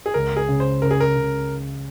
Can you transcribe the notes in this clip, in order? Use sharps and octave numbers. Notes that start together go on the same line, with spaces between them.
G#4
C#2 A#4
G#4
C#3
C5
C#3 A#4
G#4
A#4
C#3